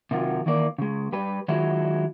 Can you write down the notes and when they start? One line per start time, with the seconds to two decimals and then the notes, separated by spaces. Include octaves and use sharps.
0.11 C3 D#3 F#3 F4
0.46 D#3 E3 A#3 D5
0.78 C#3 G#3
1.12 G3 G4 B4
1.48 D#3 F#3 G#3 E4 F4